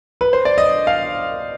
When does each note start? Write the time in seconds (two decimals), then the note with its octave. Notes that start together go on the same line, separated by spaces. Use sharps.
0.21 B4
0.33 C5
0.45 D5
0.58 D#5
0.87 F5